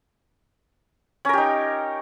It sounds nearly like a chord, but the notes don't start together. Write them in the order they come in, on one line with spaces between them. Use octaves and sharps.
C#4 A#4 G4 D#4